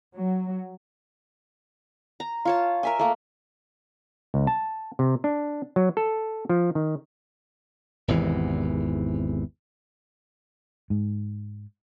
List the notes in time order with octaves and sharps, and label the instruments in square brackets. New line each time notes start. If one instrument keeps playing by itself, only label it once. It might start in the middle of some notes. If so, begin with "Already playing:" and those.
[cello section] F#3
[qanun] A#5
F4 C#5 A5
A#4 E5 G#5
A3 A#3
[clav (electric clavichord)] C#2
A5
C3
D4
F#3
A4
F3
D#3
[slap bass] G#1 E2 C3 E3
[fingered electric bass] G#2